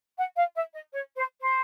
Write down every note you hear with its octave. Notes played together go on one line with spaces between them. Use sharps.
F#5
F5
E5
D#5
C#5
C5
C5